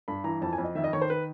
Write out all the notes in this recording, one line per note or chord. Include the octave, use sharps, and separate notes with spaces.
G2 B5
E3 A#5
F2 A5
G#5
F2
D#5
D#3 E5
D#5
D#3 C#5
C5
B4